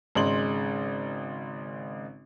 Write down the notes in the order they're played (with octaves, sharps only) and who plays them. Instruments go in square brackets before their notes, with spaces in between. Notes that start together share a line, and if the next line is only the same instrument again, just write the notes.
[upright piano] G#1 C#3 G#3 C6 F#7